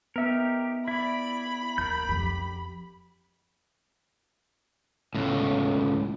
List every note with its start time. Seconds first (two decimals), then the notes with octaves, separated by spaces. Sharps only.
0.16 B3 D#4 G4 A#4 E5
0.88 E4 D5 B5
1.78 D#2 A#4 A#5 G6
2.09 F2 C#4 G4
5.15 C#2 A2